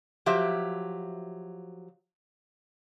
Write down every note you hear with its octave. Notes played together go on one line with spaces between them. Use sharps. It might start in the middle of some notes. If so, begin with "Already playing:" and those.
F3 F#3 G4 E5